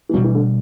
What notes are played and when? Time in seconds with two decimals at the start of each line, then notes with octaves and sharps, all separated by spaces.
0.09 E3
0.13 B2 F#3 G3 D4
0.24 E3
0.35 D3